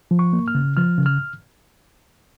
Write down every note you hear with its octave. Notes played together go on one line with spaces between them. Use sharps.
F3
C#6
A#3
F6
C#3
F3 F6
C#3
F6